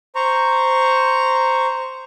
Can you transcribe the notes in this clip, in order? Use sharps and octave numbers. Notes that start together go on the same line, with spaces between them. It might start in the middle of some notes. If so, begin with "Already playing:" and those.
C5 A#5 C#6